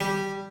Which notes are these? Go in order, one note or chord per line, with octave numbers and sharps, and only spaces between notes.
G3